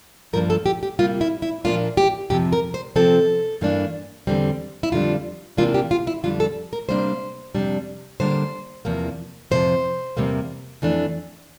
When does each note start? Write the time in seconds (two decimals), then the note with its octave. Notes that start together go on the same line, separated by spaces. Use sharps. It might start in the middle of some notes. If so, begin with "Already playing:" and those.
0.33 G2 F3 A#3 D4 A#4
0.50 A4
0.66 G4
0.83 G4
0.99 C3 G3 A#3 F4
1.21 E4
1.42 E4
1.64 A#2 F3 A#3 D4 F4
1.97 G4
2.30 F2 C3 F3 G4
2.53 A#4
2.74 C5
2.96 C3 F3 C4 A4
3.61 G2 E3 A#3 D4
4.27 E2 D3 G3 C4
4.83 E4
4.92 F2 D3 G3 D4 F4
5.57 C3 E3 A#3 D4 F4
5.74 G4
5.91 F4
6.07 E4
6.23 F2 D3 G3 D4 F4
6.40 A4
6.73 A#4
6.89 C3 G3 A#3 D4 C5
7.55 F2 C3 G3 D4
8.20 D3 G3 A#3 D4 C5
8.85 E2 C3 F3 A#3
9.51 F2 C3 F3 C5
10.17 E2 C3 G3 A#3
10.82 F2 E3 A3 D4